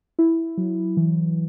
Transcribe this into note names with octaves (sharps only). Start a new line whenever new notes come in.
E4
F#3
E3